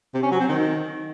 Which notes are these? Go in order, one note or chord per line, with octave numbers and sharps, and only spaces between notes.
C3
C#4
F#3
C4
D#3